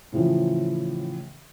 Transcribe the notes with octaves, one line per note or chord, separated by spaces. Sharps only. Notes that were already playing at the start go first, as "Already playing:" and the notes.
A2 C#3 E3 F3